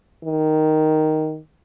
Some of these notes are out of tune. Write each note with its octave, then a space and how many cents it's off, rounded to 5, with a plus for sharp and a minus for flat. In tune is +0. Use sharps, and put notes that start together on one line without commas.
D#3 +0